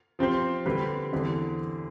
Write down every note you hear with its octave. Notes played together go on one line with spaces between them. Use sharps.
F3 C4 G4 C5
D3 G3 C4 G4 B4
E2 D3 G3 C4